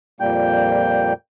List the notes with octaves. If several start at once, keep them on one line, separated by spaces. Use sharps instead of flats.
F2 A#2 G3 A#3 G5 G6